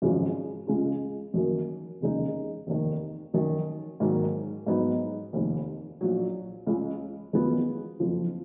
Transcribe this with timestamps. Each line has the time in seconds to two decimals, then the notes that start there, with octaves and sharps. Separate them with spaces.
0.02 G#1 F#2 C#3 F3 G#3
0.67 C#2 C#3 G#3 C#4 F4
1.34 F#2 D#3 F#3 A#3
2.01 F1 D#2 C#3 G#3 D#4
2.67 F1 D#2 D#3
3.33 F#2 D#3 F#3
4.00 G#2 D#3 F#3 A#3
4.67 G#2 F#3 B3 D#4
5.33 F1 D#2 D#3
6.01 A#1 A#2 F#3
6.67 C#2 C#3 G#3
7.33 F#2 D#3 G#3 B3 F4
8.00 F#1 F2 F3